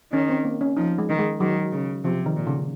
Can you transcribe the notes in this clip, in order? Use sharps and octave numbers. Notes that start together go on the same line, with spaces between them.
D#3 C#4
C4
A#3
C#4
F3 D#4
G#3
D#3
G#3
D#3 F#3
C#3
C3 F3
D#3
A#2
C#3